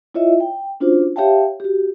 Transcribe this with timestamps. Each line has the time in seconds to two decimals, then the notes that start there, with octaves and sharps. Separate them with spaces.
0.14 E4 F4 C#5 D#5 E5
0.40 G5
0.80 C#4 D4 F4 F#4 C5
1.16 G4 C#5 E5 F5 G5 A5
1.60 F#4 G4